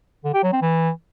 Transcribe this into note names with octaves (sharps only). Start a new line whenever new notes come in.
D3
G4
F#3
C4
E3